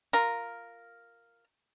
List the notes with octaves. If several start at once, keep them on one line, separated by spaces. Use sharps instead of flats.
F4 A#4